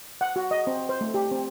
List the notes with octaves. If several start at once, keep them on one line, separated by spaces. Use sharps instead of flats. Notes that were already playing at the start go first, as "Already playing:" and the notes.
F#5
F#4
D#5
C4
C5
A3
G4
C4